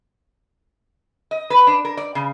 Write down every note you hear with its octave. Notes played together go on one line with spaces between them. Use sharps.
D#5
B4
D4
A#4
D5
C#3